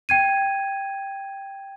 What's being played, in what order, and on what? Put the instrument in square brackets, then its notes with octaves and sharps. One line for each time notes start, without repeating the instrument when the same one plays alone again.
[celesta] G5 G#6 D#7